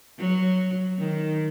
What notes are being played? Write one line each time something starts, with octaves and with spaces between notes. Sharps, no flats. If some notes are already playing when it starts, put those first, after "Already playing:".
F#3
D#3